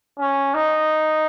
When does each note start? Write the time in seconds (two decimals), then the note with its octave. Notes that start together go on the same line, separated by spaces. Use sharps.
0.19 C#4
0.54 D#4